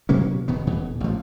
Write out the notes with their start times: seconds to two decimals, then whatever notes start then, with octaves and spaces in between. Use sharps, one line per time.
0.09 B2 F#3 A#3 C#4
0.48 D#1 B2 D#3 B3
0.67 D#1 B2 E3
1.00 A1 F3